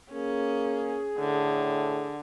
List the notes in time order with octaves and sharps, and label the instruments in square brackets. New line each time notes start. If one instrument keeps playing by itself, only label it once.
[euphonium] A#3 [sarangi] C#4 [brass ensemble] G#4
[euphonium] A2 [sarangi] D3